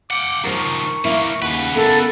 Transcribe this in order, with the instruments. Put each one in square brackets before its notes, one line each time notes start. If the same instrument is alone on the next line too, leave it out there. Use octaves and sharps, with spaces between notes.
[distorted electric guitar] F#5 G5 [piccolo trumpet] D6
[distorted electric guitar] D#3 F3 [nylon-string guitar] A#4 C5 [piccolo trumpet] C#6
[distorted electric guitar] E3 A#3 [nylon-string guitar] E4
[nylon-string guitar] D#2 [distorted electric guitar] C#3 B4 [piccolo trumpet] F#5
[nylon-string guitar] B3 E4 A#4 [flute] A4